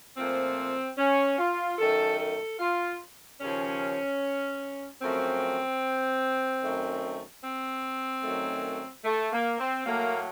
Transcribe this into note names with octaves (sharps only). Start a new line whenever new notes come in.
A#2 F3 A3 C4
C#4
F4
F#2 D#3 A3 A4
A4
F4
D#2 C#3 F3 C#4
F#2 F3 A3 C4
F#2 D#3 A3
C4
F#2 D#3 F#3 A3
A3
A#3
C4
A2 F#3 A3 A#3